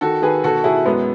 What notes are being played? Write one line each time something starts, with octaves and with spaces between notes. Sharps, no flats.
D#3 F#4 A4
D#3 G#4 B4
B2 F#4 A4
B2 E4 G#4
F#2 G#3 B3